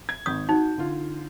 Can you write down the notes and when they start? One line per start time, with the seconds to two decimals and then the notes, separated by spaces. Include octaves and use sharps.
0.09 G#6
0.26 G#1 D#6 G6
0.49 D#4 F#4
0.78 D3 F4